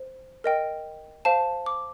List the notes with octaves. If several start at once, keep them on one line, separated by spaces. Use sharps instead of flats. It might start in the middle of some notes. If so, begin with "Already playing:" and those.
Already playing: C5
A#4 D#5 G5
C5 F5 A5
D6